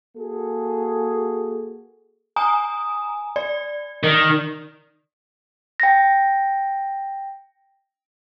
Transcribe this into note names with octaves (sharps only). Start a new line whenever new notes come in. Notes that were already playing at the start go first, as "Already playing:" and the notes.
A#3 F#4 G#4 A4
G#5 A#5 D#6
D5
D#3
G5 A#6